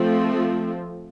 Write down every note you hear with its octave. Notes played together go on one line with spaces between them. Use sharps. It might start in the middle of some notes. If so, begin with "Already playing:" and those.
Already playing: F3 A3 C4